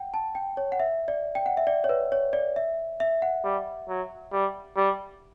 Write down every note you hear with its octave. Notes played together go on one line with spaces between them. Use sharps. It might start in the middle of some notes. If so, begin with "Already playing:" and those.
Already playing: F#5 G5
A5
G5
C#5
F#5
E5
D5
G5
F#5
E5
D5
C#5
B4
C#5
D5
E5
E5
F#5
G3
F#3
G3
G3